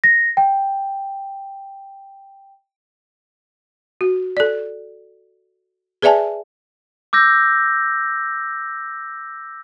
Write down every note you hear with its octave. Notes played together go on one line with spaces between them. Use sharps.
A#6
G5
F#4
A4 D5
G#4 B4 D5 E5 G#5 A5
D6 E6 G6 A#6